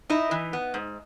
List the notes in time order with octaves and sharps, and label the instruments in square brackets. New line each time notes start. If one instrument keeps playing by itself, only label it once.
[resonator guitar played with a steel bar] D#4 E4 D#5
E3
B3
G#2